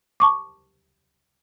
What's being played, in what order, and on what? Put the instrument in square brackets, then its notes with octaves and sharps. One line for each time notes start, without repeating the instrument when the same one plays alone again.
[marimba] A5 C#6 D6